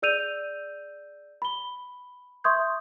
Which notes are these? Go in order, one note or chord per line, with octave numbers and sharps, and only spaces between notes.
G#4 D5 E6 G6 D#7 F7
B5 G7
E5 C6 C#6 D#6 G6 G#6